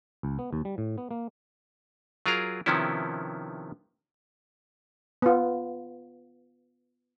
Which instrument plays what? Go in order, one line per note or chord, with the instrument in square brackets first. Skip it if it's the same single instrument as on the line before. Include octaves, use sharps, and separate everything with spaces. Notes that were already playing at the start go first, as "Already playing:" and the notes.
[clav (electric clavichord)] C#2
B3
D#2
G3
A2
B3
A#3
F#3 F4 G#4 A#4 A#5
C3 D#3 F3 B3 C#4 E4
[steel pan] B3 F4